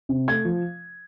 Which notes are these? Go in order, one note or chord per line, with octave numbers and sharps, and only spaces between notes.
C3
A3 G#6
F3